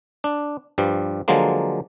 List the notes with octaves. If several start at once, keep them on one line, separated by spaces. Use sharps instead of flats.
D4
G2 F3 G3
D3 F3 F#3 G#3 A#3